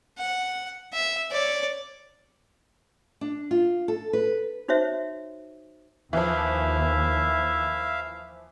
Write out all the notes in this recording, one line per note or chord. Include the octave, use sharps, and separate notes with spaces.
F#5
E5
C#5 D5
D4
F4
A4
B4
D#4 F#4 C5 C#5 E5
D#2 E3 F3 E4 E5 F5